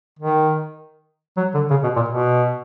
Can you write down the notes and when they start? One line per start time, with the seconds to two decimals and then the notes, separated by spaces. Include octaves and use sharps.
0.19 D#3
1.37 F#3
1.55 D3
1.71 C#3
1.83 B2
1.96 A#2
2.09 B2